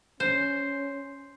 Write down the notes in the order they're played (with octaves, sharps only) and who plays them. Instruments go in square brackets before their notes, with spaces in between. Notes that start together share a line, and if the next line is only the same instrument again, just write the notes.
[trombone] C#4 [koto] C5